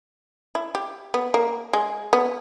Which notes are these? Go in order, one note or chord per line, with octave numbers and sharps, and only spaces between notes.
E4
G4
B3
A#3
G#3
B3